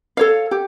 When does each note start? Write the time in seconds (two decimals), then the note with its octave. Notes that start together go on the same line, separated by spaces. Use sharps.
0.17 A4 C#5 F5
0.51 G4